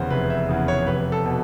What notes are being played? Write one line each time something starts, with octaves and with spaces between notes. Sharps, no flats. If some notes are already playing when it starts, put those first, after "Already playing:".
Already playing: F1 E2 C#3 B4 C5
F1 B4
E5
E2 C#3
C#5
F1 B4
A4
B2